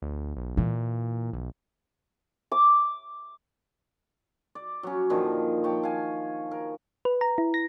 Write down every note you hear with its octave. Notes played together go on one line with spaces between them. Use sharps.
D2
B1
A#2 E3
B1
D6
D5
F#3 C#4
A#2 D3 D#3 F3
C#5 G5 A5
F5 G#5
A#4
B4
A#5
E4
A#6